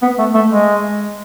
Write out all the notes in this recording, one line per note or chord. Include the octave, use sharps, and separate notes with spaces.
B3
A3
A3
G#3